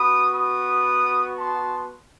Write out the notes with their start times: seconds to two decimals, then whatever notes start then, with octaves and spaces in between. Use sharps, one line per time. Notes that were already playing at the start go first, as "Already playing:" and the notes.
Already playing: B3 F#4 B5 D#6
0.33 B5 D#6
1.39 A5 C6